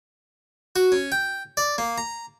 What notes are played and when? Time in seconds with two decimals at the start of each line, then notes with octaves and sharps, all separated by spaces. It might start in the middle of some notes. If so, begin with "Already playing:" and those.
0.76 F#4
0.92 C#4
1.12 G5
1.57 D5
1.78 A#3
1.98 A#5